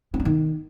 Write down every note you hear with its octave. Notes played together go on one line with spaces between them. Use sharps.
B3
D4
D#3